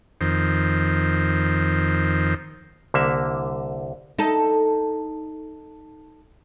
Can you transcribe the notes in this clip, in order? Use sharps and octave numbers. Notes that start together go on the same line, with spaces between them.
F2 D#3 C5
C2 D3 A#3 E5
D#4 A4